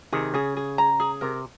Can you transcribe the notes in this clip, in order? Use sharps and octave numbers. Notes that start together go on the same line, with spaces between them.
C3 D#3 G#4
C#3 G#4
G#4
A#5
G#4
C3 A#4